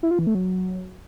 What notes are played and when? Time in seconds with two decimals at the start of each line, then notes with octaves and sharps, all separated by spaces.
0.03 E4
0.11 F4
0.19 E3
0.27 A3
0.35 F#3